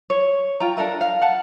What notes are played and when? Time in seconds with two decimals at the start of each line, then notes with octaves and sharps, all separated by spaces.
0.10 C#5
0.60 F4 G5 A#5
0.77 D4 A4 A#4 E5
1.01 F5
1.22 F#5 A5